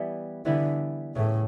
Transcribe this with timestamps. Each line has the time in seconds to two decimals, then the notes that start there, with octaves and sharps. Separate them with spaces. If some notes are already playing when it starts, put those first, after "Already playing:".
Already playing: E3 G3 B3 E4
0.45 D3 E3 G3 B3 E4
1.15 A2 C#3 E3 A3